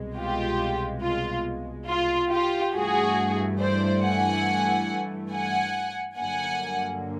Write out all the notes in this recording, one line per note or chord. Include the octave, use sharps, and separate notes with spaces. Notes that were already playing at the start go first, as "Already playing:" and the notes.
Already playing: C2 B2 G#3
F4 G4
F4
F4
F4 G4
G2 E3 A3 F#4 G#4
C5 D5
F#5 G#5
F#5 G#5
G2 D3 F#3 A#3 F#5 G#5